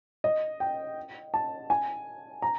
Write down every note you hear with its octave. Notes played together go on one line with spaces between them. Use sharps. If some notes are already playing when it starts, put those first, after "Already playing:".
D#5
G5
A5
G#5
A#5